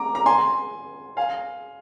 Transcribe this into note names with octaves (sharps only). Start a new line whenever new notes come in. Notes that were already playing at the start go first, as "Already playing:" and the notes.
Already playing: A#5 D6
A#5
G#5 C6
F5 G#5